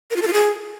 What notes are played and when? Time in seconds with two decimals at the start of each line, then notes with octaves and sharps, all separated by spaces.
0.11 A#4
0.16 F4
0.22 A4
0.27 F4
0.33 G#4